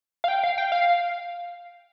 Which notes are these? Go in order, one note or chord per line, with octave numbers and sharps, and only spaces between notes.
F5
G5
F5
G5
F5